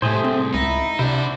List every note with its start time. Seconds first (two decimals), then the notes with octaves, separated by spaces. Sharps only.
0.02 C2 A2 C3 A3 G#4 C5
0.24 C2 C4
0.54 C#2 D#4 E4
0.99 C3 D4 E4 F#4 C5